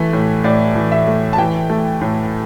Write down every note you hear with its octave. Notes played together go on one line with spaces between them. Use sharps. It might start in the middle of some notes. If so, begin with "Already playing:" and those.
Already playing: E3 A3
A2
A2 D5
E3
E5
A3
A5
E3 G5
A3
A2